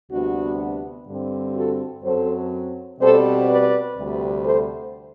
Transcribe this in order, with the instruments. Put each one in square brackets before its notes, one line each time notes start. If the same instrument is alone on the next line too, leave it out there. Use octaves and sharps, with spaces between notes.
[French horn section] D2 C3 G3 B3 D4 F#4
G2 D3 G3 C4
F#4 A4
F#2 F#3 C4 A4 C5
B2 G3 C4 A4 C5
B4 D5
D2 C3 G3
A4 C5